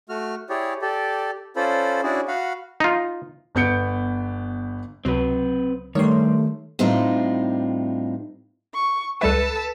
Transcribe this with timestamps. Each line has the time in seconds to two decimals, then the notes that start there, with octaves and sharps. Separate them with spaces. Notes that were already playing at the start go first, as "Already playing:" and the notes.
0.09 A3 F#4 F6
0.49 E4 G4 G#4 C#5 D5
0.82 G4 A4 D5
1.56 C#4 F4 A4 C5 D5 B5
2.03 C#4 D4 E4 F#4 G#4 D5
2.28 F#4 F5 F#5 B5
2.80 D#4 F4
3.55 G1 B3 G6 C#7 D7
5.05 C#2 C3 F#3 C4 B4
5.95 G2 D#3 G3 A3 C#5 C6
6.79 A2 G3 C4 D4 D#4 F4
8.74 C#6
9.21 C#2 G3 A4 B4 E5 A5 E6